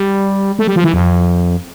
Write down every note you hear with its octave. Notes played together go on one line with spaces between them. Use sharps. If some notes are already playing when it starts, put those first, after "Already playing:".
Already playing: G3
A3
G3
F3
E3
F2